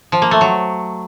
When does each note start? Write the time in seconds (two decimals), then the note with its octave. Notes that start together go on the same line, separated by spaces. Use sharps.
0.12 F3
0.22 A#3
0.31 A3
0.41 F#3